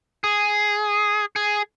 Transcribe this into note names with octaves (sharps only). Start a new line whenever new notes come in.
G#4
G#4